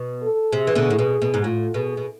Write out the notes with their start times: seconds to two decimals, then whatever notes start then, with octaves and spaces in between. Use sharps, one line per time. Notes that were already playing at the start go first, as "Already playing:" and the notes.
Already playing: B2
0.22 A4
0.53 C3 G#4
0.67 E3
0.75 B2 D3
0.90 A2
0.99 B2
1.22 B2
1.34 G#2
1.44 A2 F4
1.74 B2 G#4
1.97 B2